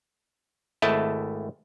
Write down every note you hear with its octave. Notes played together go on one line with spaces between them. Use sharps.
G#1 A3 E4 D#5 A5